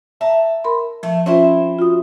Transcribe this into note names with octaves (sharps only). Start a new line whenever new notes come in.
E5 A5 A#5
A#4 B5 C6
F3 A3
C4 C#4 E4 F4 C5
F4 F#4 D#6